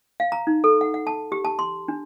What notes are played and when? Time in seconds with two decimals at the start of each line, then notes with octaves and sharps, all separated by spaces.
0.20 F5
0.32 A#5
0.47 D#4
0.64 A4
0.81 F#5
0.94 F#5
1.07 A5
1.32 G4
1.45 A5
1.59 C6
1.88 D4